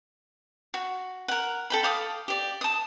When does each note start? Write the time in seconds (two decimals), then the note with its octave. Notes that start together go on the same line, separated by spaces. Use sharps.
0.74 F#4
1.28 A#4 F#5
1.70 A4 G5 B5
1.83 F5 D6 D#6
2.28 G4 D5
2.61 A5 D#6